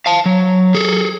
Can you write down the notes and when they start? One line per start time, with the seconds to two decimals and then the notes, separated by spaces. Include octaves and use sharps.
0.06 F5 A5
0.26 F#3
0.74 G#4 A4